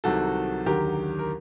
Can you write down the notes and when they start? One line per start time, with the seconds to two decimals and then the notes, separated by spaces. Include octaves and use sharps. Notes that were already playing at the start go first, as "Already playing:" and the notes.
0.04 C2 C3 D#3 F#3 F#4 A4
0.66 D#2 D3 F#3 G4 A#4
1.19 A#4